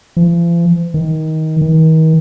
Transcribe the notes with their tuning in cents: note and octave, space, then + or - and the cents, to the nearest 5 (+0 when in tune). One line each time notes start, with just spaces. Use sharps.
F3 -45
D#3 +20
D#3 +40